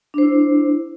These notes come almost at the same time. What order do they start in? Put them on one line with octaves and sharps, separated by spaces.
D4 C5 E4